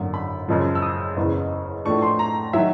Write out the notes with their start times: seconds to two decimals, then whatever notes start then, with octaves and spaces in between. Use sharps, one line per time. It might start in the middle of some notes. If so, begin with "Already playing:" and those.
Already playing: G#1 F#2 D3 F#3 A#3
0.14 B5
0.48 F#2 C#3 F3 G#3
0.75 E6
0.82 D#6
1.17 F#1 E2 C#3
1.85 A2 F3 A3 D4 C#6
2.02 C6
2.19 A#5
2.53 D#3 F#3 E5